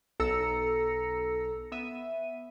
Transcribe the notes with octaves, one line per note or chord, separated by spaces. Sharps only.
B1 A4 A#5 E6 A#6 C#7
B3 E5 D#7